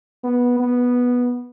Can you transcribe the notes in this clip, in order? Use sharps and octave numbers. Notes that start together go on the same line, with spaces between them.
B3
B3